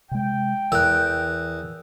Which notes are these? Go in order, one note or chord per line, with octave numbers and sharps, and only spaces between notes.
C3 G#3 G5
E2 E3 A#4 E6 F#6